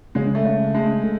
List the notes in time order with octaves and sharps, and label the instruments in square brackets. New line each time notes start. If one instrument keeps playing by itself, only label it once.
[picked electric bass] C#3 [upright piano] G#3
[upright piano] A3
[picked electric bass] C#3
[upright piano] G#3 [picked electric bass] A3
[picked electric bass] A3